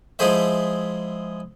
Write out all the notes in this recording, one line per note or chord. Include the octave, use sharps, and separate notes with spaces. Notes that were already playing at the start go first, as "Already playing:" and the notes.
F3 G#3 E4 G#4 C5 E5